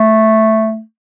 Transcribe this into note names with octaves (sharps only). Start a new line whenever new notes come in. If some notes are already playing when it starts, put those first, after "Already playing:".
Already playing: A3